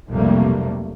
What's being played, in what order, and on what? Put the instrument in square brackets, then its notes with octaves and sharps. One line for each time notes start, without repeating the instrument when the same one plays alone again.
[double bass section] B1 F2 C3 G3 A3 A#3